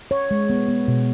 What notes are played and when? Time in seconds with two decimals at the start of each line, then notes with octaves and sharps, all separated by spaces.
0.11 C#5
0.31 G#3
0.50 B3
0.68 B3
0.88 B2